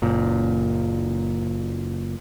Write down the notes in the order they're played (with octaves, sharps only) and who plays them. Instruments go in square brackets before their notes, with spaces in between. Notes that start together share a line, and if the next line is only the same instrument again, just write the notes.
[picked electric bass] F#1 A#2